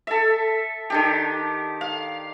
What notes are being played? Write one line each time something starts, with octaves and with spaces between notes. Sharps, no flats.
A4 E5
D#3 D4 G4
F5